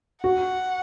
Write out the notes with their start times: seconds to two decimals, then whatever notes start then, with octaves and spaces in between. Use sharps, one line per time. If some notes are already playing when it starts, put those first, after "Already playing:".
0.24 F#4 F#5